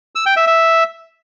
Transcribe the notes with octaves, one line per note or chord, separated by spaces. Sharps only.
E6
G5
E5
E5